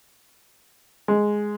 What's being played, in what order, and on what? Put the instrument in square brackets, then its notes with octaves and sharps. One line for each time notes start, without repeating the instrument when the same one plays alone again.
[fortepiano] G#3